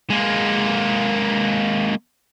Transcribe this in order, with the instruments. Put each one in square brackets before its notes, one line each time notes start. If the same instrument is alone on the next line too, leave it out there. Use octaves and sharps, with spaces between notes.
[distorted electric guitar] G#3 A#3